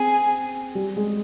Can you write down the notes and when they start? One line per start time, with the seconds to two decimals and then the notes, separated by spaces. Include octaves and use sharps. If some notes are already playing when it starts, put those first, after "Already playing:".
Already playing: C4 G#4
0.75 G3
0.96 G#3